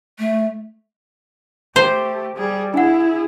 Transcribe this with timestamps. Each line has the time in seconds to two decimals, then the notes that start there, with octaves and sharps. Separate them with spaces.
0.19 A3
1.76 A3 G4 C5
2.37 G3 G#4
2.74 D4 E4 G#4 F#5